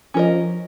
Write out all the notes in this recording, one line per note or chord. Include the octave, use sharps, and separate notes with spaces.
F3 C#4 A#4 D#5